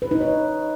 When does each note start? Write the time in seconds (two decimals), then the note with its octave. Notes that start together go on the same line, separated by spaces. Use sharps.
0.02 B4
0.11 D#4
0.20 C#5